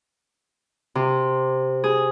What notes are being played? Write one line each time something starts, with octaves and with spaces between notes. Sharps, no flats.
C3
G#4